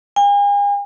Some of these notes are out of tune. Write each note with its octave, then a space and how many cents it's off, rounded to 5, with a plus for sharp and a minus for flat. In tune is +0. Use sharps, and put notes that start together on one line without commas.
G#5 -45